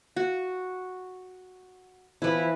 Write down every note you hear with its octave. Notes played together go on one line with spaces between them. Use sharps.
F#4
E3 F3 E4 B4